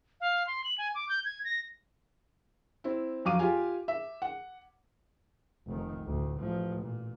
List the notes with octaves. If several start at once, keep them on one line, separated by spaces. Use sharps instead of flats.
F5
C6
F#7
G#5
D6
G6
G#6
A#6
C4 E4
F2 F#3 F5 D6 D#7
F4 G4 F5 G#5
E5
F#5
F1 D#3
D2 A2
A1 F3
A#2